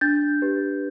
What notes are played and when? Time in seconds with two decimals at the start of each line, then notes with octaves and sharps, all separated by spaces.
0.01 D4 G6 A6
0.42 G4 B4